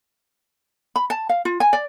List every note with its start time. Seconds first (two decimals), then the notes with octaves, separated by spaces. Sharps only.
0.96 B5
1.10 A5
1.29 F5
1.45 F4
1.60 G#5
1.73 D5